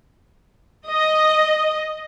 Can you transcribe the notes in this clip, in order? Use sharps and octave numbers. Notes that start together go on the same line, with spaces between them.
D#5